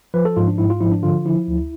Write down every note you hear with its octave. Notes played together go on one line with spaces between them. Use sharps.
F3 B4
A4
G#2 F4
D4
G#2 E4
F4
F3 E4
D4
D3 F4
F3 E4
D2